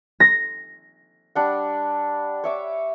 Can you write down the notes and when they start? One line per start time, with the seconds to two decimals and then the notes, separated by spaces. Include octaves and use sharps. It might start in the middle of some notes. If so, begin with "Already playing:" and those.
0.20 A#6
1.35 G3 D4 F#5
2.44 C#5 E5 D6